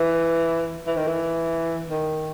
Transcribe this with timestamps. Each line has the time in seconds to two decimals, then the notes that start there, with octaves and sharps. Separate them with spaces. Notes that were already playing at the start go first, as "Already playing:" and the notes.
Already playing: E3
0.87 E3
0.97 D#3
1.08 E3
1.90 D#3